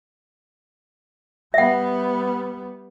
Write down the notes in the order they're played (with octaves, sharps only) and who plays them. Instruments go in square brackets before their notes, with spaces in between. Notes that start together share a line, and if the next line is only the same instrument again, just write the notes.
[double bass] G3 B3 [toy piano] E5 F#5